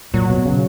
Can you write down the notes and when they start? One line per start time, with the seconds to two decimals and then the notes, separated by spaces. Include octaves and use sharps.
0.14 A#2 F#3
0.29 B2
0.45 C#3